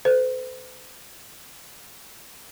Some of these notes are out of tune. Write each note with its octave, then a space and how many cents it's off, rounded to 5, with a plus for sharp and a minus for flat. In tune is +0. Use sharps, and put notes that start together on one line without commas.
A4 +0 C5 -45